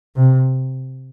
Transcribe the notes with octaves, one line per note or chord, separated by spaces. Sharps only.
C3